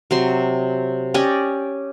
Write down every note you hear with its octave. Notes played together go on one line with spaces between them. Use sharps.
C3 F#3 C6
C#4 G4 D5 D#5